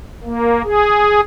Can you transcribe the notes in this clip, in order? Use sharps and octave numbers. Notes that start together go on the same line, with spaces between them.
A#3
G#4